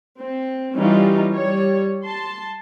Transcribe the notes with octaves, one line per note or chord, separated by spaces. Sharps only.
C4
E3 G3 C#4 D#4 F4
G3 C#5
A5 C6